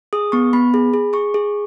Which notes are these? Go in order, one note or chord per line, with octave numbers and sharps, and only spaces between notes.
G#4 D#6
B3 C#6
B3 B5
G#4
G#4
G#4 C#6
G#4